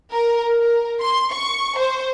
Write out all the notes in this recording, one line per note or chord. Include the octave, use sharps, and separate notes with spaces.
A#4
A#4
C6
C#6
C5